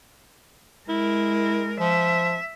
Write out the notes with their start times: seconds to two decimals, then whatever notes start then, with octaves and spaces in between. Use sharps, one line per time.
0.89 G#3 E4 A#4
1.80 F3 E5